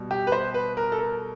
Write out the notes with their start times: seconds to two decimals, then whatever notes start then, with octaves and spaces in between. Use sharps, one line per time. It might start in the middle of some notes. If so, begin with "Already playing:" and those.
Already playing: B2 G3
0.11 G4
0.27 B4
0.32 C5
0.54 B4
0.77 A#4
0.92 A4
0.99 A#4